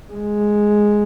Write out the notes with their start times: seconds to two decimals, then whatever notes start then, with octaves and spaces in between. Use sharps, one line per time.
0.13 G#3